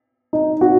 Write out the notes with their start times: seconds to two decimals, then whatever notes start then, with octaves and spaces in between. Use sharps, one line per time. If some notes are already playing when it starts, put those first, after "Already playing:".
0.33 D#4
0.61 F#4